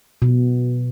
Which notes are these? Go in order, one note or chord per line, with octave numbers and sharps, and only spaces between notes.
B2